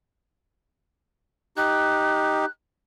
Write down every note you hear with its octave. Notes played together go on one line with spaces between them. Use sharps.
D#4 G4 F#6